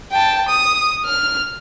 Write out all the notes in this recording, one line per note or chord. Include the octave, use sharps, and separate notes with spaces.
G5 A5
D#6
F6